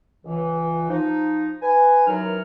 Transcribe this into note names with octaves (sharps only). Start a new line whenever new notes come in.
C#2 E3
F3 D#4
B4 G#5
F#2 D#3 E3 F#3 D#4 F6